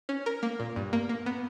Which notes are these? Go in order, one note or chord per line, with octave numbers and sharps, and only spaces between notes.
C#4
A#4
A#3
A#2
G2
A#3
A#3
B3